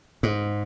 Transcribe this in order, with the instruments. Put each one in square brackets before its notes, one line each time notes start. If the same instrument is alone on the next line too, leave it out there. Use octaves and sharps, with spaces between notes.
[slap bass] G#2